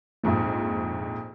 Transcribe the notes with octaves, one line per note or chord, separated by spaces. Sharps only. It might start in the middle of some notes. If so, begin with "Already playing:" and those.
A#1 F2 G#2 F3